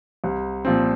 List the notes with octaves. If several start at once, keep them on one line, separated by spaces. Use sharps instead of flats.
C2
A#2 F3 C4